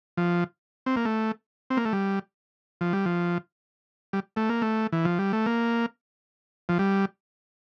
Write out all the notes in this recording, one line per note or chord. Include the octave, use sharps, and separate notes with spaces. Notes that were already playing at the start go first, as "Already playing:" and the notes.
F3
C4
A#3
A3
C4
A#3
A3
G3
F3
G3
F3
G3
A3
A#3
A3
E3
F3
G3
A3
A#3
F3
G3